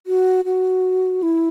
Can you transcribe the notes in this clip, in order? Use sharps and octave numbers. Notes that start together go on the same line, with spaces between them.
F#4
F#4
E4